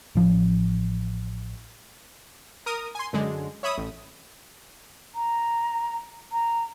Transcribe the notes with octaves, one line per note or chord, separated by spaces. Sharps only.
A1 F3 A#3 C#4
A#4 D#6
G#5 C6
F#2 D3 G#3
C#5 E5 B5 D#6
A1
A#5
A#5